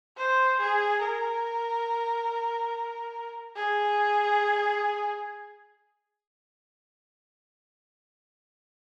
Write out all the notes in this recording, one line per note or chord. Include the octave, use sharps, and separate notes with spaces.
C5
G#4
A#4
G#4